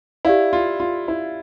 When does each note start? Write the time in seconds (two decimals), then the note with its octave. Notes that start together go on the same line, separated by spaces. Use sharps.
0.25 E4 G4 D5 F5
0.53 F4
0.80 F4
1.08 E4